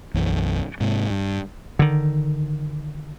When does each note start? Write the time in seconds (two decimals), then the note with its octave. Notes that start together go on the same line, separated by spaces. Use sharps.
0.14 B1 F#2 E3
0.80 G#2 C3
1.10 G2
1.79 D3 D#3